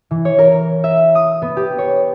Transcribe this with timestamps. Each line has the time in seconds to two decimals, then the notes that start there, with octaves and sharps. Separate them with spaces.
0.11 E3
0.25 C#5
0.38 A#4
0.84 E5
1.15 D#6
1.42 B3
1.57 G4
1.78 C#5